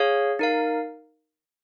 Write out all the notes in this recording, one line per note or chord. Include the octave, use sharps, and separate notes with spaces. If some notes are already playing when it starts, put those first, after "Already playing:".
Already playing: G#4 C#5 F5
D#4 A#4 F5